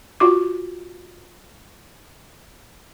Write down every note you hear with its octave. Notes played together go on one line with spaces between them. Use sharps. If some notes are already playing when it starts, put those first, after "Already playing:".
F4 F#4 D6